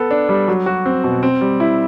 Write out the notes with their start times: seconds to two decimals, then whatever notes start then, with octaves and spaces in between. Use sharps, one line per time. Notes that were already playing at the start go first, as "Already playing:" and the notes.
Already playing: B3 A4
0.11 D4
0.29 G3
0.48 F#3
0.66 F#4
0.86 C4
1.04 B2
1.23 C4
1.41 G3
1.60 E4